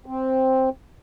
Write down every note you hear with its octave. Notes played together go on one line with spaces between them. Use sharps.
C4